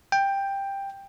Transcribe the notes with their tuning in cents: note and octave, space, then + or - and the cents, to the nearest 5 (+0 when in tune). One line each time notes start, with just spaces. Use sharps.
G5 +10